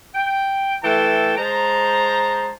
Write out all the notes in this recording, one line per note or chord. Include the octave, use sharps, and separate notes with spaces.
G5
E3 A3 A4 G5 A5
G#3 C5 A5 A#5